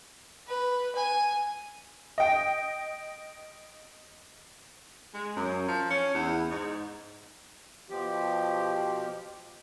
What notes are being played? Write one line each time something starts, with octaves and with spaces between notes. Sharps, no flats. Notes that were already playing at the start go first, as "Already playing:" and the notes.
B4
G#5
D#5 G5
G#3
F#2
F3
C#4
E2
G#2
B2 F3 G4